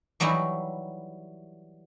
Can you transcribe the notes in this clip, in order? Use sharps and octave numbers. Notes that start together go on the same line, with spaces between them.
E3 F#3 G3 D#4 E4